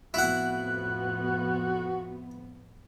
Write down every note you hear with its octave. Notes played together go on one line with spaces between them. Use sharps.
F2 A2 B3 E4 F#4 F#5 F#6